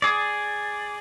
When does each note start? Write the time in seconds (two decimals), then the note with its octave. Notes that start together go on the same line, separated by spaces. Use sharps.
0.02 G#4 D5